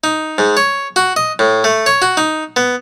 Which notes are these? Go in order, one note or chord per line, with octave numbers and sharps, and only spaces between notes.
D#4
G#2
C#5
F#4
D#5
A2
A3
C#5
F#4
D#4
B3